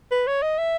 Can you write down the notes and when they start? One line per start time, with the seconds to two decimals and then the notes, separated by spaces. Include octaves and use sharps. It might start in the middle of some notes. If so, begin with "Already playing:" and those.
0.11 B4
0.27 C#5
0.42 D#5
0.58 E5